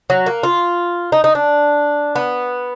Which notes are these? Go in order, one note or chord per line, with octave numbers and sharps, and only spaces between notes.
F#3
A#3
F4
D#4
D#4
D4
B3